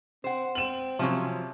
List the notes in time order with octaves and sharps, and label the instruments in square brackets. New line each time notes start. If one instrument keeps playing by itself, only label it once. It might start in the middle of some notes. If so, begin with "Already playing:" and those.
[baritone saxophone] C4 [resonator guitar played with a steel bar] C5 F#5
[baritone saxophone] C4 [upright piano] E7 F#7
[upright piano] C3 [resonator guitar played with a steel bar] F3 F#3 [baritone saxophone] C#4